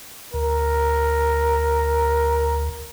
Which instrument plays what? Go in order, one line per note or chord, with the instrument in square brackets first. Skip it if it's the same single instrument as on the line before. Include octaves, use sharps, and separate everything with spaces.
[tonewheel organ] D2 [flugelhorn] A#4